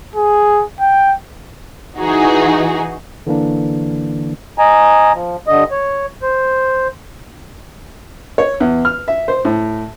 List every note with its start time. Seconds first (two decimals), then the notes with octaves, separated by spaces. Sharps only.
0.16 G#4
0.80 G5
1.98 E3 D#4 F#4 G#4
3.27 D3 E3 A#3 D4
4.58 D#5 G#5 A#5
5.14 F3
5.47 G2 D3 D#5
5.71 C#5
6.22 C5
8.38 C#5
8.60 E2
8.85 F6
9.08 E5
9.28 C5
9.45 A2